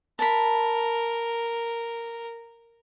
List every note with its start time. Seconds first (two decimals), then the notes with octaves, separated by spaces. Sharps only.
0.19 A#4 A5 B5